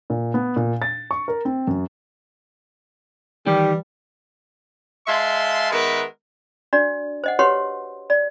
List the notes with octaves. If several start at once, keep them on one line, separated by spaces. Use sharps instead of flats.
A#2
B3
A#2
A6
C#6
A#4
C4
F#2
D#3 E3 G3 G4
G#3 E5 F5 A5 C6
D#3 G#3 B3 A#4 B4 E5
D4 F#4 D5
C5 D#5 F#5
F#4 G4 B4 C#5 F#5 C6
D5